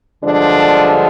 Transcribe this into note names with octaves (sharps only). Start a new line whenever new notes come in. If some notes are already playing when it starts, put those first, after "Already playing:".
G2 D3 F3 G#3 D4